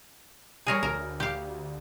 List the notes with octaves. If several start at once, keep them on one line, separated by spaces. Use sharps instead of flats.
G3 G#4 A#4 C#5
D2 A#4
G4 F5